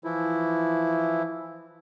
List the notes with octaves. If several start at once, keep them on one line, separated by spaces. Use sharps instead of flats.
E3 F3 E4